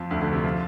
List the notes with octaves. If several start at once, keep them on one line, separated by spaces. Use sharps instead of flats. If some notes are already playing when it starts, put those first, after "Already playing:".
Already playing: F2 F3
D2 D3
D2 D3
C3
F3